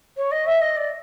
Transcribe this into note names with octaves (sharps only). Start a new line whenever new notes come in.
C#5
D#5
E5
D#5
D5